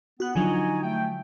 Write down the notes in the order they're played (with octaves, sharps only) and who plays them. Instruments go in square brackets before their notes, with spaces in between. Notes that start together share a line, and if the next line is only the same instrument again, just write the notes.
[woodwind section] B3 [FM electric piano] F#4 F#6
[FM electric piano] D3 F3 F#3 [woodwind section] D#4 F#4 G#5
[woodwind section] A3 G5